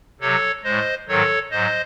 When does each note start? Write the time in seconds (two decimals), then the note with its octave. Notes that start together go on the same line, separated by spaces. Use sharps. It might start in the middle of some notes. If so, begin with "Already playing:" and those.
0.20 C3 F#3 A4 C#5
0.64 A2 G#3 C5 D#5
1.07 G#2 D#3 F#3 A4 C#5
1.51 G#2 F#3 C5 D#5